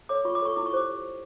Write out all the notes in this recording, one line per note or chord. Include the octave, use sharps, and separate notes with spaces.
A4 C#5 D6
F4 C#6
D6
A4 C#5 C#6
E4 D6
C#6
G4 C5 D6